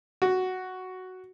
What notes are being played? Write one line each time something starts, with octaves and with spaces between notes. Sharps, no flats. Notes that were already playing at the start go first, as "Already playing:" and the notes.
F#4